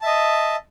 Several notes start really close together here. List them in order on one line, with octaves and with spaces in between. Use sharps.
A5 E5 D#5